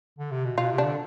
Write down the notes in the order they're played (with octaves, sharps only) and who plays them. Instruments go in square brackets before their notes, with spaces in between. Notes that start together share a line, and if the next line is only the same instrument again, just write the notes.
[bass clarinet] D3
C3
B2
[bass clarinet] B2 [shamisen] F4
[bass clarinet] C3
[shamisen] D4
[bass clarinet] D3